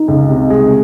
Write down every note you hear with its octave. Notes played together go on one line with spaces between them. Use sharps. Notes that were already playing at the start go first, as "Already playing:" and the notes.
Already playing: D#4
C#2
C3
G#3